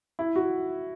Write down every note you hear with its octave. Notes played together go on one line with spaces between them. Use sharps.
E4
F#4